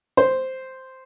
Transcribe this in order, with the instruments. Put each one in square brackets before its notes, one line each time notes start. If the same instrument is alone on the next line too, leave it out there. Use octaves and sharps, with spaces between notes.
[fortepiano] C5